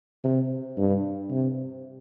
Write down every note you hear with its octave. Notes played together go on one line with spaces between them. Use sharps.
C3
G2
C3